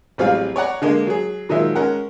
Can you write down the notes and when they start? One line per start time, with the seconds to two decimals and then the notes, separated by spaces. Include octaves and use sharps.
0.18 A1 F#3 G3 C4 G#4 F5
0.56 C#5 D5 F#5 A#5
0.82 D3 G#3 A#3
1.07 F#3 G#4
1.49 A#2 D#3 F#3 G#3 E5
1.75 G#3 C#4 A#4 F#5